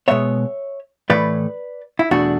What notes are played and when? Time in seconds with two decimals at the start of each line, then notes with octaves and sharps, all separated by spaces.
0.08 B2 G#3 B3 C#5 E5
1.10 A2 E3 A3 B4 D5
1.99 E4
2.11 E2 B2 A3 D4 F#4